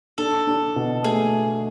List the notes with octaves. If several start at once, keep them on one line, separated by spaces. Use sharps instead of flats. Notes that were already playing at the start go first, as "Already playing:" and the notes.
D4 A4
D4
B2
A3 G#4